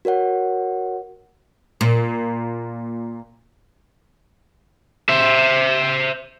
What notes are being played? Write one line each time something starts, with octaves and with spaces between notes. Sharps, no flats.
F#4 A#4 C#5 F#5
A#2
C5 E5